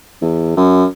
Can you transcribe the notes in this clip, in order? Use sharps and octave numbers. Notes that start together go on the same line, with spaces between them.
E2
F#2